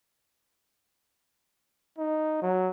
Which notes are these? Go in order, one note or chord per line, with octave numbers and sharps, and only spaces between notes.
D#4
F#3